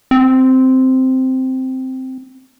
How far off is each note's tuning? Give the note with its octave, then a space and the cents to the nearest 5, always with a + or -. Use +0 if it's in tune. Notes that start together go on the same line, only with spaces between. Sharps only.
C4 -5